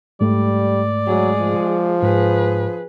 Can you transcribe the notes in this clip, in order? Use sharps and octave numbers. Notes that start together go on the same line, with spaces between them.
G#2 G3 A3 D5
F#3 G#3 G#4
F3
G#2 G#4 B4